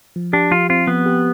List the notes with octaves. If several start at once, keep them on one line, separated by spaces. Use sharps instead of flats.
F3
D4 G4
F3 F4
C4 F4
F3 B3
G4